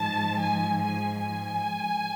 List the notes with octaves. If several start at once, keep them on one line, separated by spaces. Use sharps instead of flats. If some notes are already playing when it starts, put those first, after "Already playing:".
Already playing: G#2 F3 A5
G#5
G#5
G#5